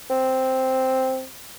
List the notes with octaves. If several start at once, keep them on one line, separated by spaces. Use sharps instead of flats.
C4